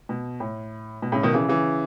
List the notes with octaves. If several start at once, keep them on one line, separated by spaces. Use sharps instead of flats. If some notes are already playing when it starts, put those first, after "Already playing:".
B2
A2
B2
A2 C#3
B2 D#3
C#3 E3
C#3 E3